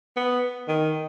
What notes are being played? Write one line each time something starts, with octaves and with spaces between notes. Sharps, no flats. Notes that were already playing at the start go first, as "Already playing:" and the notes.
B3
D#3